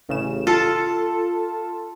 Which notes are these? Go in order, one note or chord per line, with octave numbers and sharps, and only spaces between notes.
A1 C#3 E7
F4 A4 A5